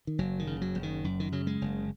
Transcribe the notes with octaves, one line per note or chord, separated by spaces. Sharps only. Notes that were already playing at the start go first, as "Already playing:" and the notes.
D#3
F#1 F#3
D#3
C#3
F#3
F#1
D#3
F#2
D#3
C#3 F#3
G#3
F#1